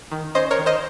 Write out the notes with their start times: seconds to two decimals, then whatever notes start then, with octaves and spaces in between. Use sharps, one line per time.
0.11 D#3
0.35 C#4 C5 D#5
0.51 A#4 C#5
0.59 D#3
0.66 C5 D#5